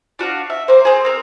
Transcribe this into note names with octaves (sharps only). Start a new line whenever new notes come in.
D4 F#4 F5
E5
A#3 C5
C4 G#4
C4 A#4